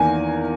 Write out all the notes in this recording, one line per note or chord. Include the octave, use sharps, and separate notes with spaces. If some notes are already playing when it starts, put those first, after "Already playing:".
Already playing: E2 D#3 A#3 G#5